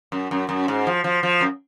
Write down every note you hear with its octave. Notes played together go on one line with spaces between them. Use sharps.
F#2
F#2
F#2
G#2
F3
F3
F3
F#2